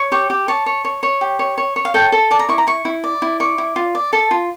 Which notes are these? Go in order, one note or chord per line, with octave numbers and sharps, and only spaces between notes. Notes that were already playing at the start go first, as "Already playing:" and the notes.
Already playing: C#5
G4 C#6
G4
C#5 A5
C#5
C#5
C#5
G4
C#5
C#5
C#5
F5
A4 G5
A4
D5 A5
A#5
E4 C#6
A#5
E4 C#6
E4
D5
E4
D5 C#6
E4
F4
D5
A4 A5
F4